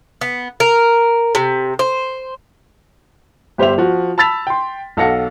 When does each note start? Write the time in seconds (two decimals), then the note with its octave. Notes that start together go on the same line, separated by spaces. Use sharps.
0.21 B3
0.60 A#4
1.35 C3
1.79 C5
3.58 G1 G4 C5 E5 F7
3.78 F3 F#4
4.18 A5 B5 E6 A6 B6 F7
4.47 G5 C6
4.97 B1 A4 F5 F#5 A#6 C#7